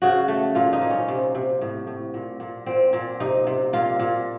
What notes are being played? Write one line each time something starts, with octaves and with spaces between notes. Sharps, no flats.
C#3 F#4
A3
A#2 F4
D#4
A#2
C#4
C3
C3
A2
A2
A#2
A#2
A#2 C4
A#2
C3 D#4
C3
A#2 F4
A#2